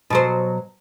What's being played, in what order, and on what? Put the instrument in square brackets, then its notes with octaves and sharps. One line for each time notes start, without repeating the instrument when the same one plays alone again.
[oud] B2 F#3 C5